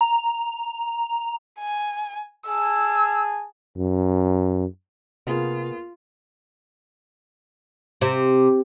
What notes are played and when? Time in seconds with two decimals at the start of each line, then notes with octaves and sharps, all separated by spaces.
0.01 A#5
1.60 G#5
2.47 G#4 G#5 A5 E6
3.76 F#2
5.27 C3 A#3 B3 F4 G#4
8.01 C3